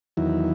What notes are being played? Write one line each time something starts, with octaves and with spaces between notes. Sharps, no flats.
E2 D#3 F#3 E4